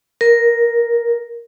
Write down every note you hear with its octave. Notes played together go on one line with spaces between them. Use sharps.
A#4